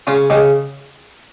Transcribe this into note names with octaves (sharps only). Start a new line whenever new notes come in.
C#3 C#4 F4
C#3 D#4 G4